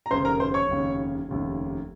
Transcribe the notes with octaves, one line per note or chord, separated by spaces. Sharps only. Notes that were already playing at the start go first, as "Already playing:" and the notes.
A#5
F1 D#2 C#3 C5 C6
A#4 A#5
C5 C6
C#5 C#6
F1 D#2 C#3
F1 D#2 C#3